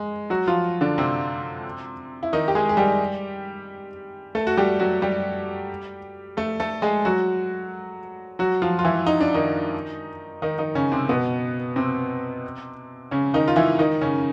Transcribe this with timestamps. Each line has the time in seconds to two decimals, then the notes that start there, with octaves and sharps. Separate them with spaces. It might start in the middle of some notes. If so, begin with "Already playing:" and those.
Already playing: G#3
0.30 F#3 F#4
0.47 F3 F4
0.81 D3 D4
0.98 C3 C4
2.23 E4
2.33 D#3 D#4
2.48 G4
2.55 G#3 G#4
2.69 G#4
2.77 G3 G4
4.35 A3 A4
4.47 F#4
4.57 G3 G4
4.80 F#3 F#4
5.02 G3 G4
6.37 A3 A4
6.60 A3 A4
6.82 G#3 G#4
7.05 F#3 F#4
8.39 F#3 F#4
8.62 F3 F4
8.79 F4
8.85 E3 E4
9.07 D#4
9.21 D4
9.34 D#3 D#4
10.42 D#3 D#4
10.58 D#3 D#4
10.75 C#3 C#4
10.92 C3 C4
11.09 B2 B3
11.76 C3 C4
13.11 C#3 C#4
13.34 D#3 D#4
13.48 F4
13.56 E3 E4
13.79 D#3 D#4
14.01 C#3 C#4